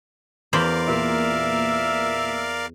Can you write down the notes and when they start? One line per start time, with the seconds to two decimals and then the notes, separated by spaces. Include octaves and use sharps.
0.53 E2 A#4 C5 D5 F5 B5
0.88 A#2 A#3 E5